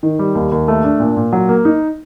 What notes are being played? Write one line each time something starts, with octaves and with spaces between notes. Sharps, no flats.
D#3
G3
D#2
D#2
A3
D4
A#2
A#2
F#3
A#3
D#4